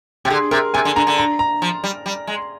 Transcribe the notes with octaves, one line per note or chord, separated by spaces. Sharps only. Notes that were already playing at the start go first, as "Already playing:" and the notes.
C3 G4
D3 G#4
C3 A#4
C3 G#5
D3
D3 A#5
D3
A#5
A#5
F3
G3
G3
G#3